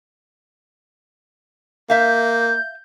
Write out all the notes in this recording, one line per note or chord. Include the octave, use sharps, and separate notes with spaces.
A#3 E5 F5 G6